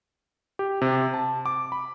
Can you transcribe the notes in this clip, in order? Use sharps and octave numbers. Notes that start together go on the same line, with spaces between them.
G4
C3
A5
D6
B5